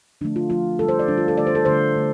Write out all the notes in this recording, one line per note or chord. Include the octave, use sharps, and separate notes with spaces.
D3 F3 A3 D4
F4
D3 F3 A3 F4
D3 G3 A4
C5
D5
D3 G3 D4
F4
A4
D3 A3 D5
C5
A4
D3 A3 C5
D3 A3